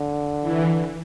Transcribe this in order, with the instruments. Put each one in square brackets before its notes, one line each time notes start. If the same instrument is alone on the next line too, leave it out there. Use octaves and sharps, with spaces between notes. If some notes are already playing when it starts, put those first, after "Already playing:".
Already playing: [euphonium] D3
[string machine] E3